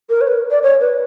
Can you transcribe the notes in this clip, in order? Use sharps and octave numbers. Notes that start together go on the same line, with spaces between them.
A#4
C#5
B4
D5
C#5
B4